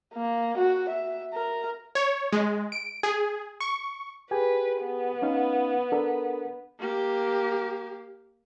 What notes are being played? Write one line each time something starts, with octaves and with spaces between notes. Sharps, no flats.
A#3
F#4
E5
A#4
C#5
G#3
D7
G#4
C#6
G4 G#4 B4 G#5
B3
C#4 D#4 F5
D4 A4 A#4
A#3 G4